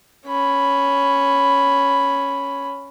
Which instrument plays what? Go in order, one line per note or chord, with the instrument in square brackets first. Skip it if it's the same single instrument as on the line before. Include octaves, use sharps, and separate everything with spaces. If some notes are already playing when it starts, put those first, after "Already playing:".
[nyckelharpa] C#4 B5